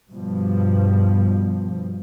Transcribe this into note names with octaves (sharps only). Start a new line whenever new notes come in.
G2 B2 F3